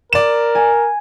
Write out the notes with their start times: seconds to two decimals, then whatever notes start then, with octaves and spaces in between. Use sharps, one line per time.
0.13 A#4 D5 E7
0.55 G#5